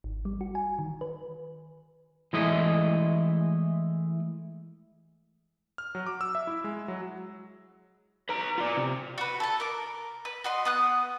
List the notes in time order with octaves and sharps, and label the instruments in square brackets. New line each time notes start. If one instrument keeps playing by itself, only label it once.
[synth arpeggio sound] G#1
G3
F#4
G#5
D#3
B4
[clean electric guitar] E3 G#3 A3 E4 D#5
[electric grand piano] F6
F#3
D6
E6
E5
E4
G#3
F#3
[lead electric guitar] B4 A#5
F4 D5
C3
[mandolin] F#4 B4
A4 A5
A#4 D6
B4
F#4 D#5 C6
B3 D#6 F#6